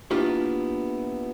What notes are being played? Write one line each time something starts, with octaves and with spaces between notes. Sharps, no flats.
A#3 B3 D4 E4 F4 G4